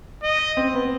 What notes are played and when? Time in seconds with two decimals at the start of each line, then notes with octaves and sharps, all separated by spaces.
0.23 D#5
0.57 C4
0.75 B3